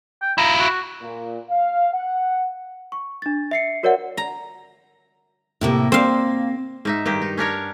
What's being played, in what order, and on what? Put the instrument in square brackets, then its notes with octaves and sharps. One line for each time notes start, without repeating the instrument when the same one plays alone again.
[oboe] G5
[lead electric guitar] E4 F4 [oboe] A#5
[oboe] F#4
[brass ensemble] A#2
F5
F#5
[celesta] C#6
D4 A6
E5 C7 C#7
F#4 A#4 C#5 D5 E5 F#5
[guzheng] A#5
[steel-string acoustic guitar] A2 C3 A#3
[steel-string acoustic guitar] A#3 [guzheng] C4 F5
[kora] G#2 D#4 E5
G2 D#3 G4
D#4
C#4 D4 A#4 C#5